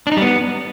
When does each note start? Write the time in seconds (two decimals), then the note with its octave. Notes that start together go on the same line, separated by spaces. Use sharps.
0.07 D4
0.12 D#4
0.17 G3
0.22 B3